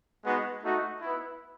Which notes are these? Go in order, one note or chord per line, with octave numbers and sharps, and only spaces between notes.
G#3 B3 D#4 F#4
A3 D#4 F#4
B3 E4